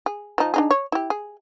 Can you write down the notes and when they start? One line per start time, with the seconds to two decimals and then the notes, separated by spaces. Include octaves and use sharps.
0.06 G#4
0.38 F3 D#4
0.54 D4 D#4 G#4
0.71 C#5
0.92 E4 G4
1.10 G#4